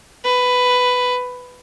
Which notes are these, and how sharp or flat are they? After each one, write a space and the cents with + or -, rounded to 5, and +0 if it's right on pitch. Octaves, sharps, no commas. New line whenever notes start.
B4 +10